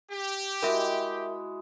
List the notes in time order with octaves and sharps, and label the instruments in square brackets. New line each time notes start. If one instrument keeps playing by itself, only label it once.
[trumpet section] G4
[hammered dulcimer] G#3 E4 F#4 [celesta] A#4 E5